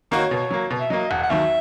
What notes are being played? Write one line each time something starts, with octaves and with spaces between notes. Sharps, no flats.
D#3 A#3 D#4 F#4
C#5
B2
F#3 A#3
B2
E5
F#3 A#3 D#5
E1 F#5
F#5
D#2 D#3 F#3 E5